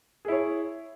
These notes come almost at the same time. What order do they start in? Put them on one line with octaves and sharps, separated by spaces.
G#4 E4 C#5